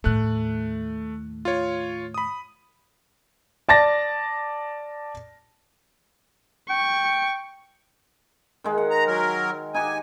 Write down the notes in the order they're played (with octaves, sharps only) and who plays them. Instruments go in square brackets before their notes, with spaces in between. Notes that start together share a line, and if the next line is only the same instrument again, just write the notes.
[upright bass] D#2 A2 [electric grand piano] A3 F#6
[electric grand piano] F4 C#5
B5 D#6
[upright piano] D5 A5 A6 A#6
[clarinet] G5 [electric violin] C#6
[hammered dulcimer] D#3 G#3
F#5
[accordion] A#5
F#3 A#4
[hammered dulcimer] D#4 F#4 G4 [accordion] G#5